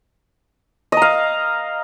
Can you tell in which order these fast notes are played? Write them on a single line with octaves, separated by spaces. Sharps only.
D#5 A#5 F5